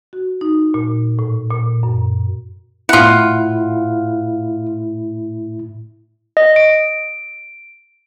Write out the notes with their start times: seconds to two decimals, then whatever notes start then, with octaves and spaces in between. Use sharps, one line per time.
0.13 F#4
0.41 D#4
0.74 A#2
1.19 A2
1.50 A#2
1.83 F#2
2.89 A2 E4 F4 F#5
6.37 D#5
6.56 D7